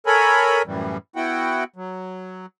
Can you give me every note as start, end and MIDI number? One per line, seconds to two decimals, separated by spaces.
0.06 0.62 69
0.06 0.62 70
0.06 0.62 73
0.06 0.62 80
0.06 0.62 83
0.66 0.97 42
0.66 0.97 45
0.66 0.97 52
0.66 0.97 55
1.16 1.64 59
1.16 1.64 64
1.16 1.64 66
1.16 1.64 78
1.16 1.64 79
1.76 2.46 54